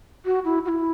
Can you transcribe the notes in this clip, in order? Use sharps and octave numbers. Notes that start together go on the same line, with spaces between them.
F#4
E4
F#4
E4